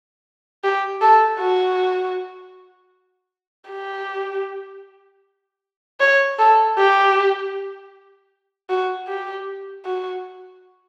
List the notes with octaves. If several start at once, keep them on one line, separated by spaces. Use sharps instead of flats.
G4
A4
F#4
G4
C#5
A4
G4
F#4
G4
F#4